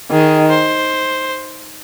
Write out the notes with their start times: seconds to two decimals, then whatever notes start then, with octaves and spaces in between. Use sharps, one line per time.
0.11 D#3 G#4
0.50 C5